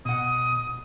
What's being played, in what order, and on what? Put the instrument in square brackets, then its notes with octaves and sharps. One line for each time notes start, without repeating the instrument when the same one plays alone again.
[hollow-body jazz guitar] B2 F#5 [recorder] D#6